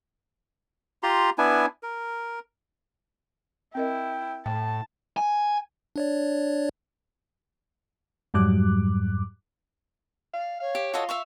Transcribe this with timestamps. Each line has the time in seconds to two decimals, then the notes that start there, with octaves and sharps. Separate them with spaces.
1.03 F4 G4 A#5 C6
1.38 B3 D4 E4 G#5
1.83 A#4
3.75 C4 E4 A#4 D#5 G5
4.46 A2 G5 A5
5.17 G#5
5.96 D4 C#5 D5
8.34 F2 G#2 F#3 G3 D6 F#6
10.34 D5 F5
10.60 C#5 F5
10.75 G4
10.94 F4 F#4 A4 D#5
11.09 E5 F5 C#6